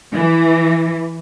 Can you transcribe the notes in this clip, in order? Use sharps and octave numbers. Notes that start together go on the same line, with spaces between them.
E3